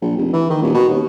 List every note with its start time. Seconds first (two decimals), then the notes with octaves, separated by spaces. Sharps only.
0.02 A#1
0.17 F1
0.33 E3
0.50 D#3
0.62 D#1
0.75 B2
0.89 D#2